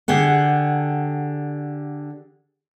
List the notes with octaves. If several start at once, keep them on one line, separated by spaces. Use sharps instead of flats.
D3 G4 G#4 F#5